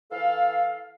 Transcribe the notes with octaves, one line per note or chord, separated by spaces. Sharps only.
E3 A4 F5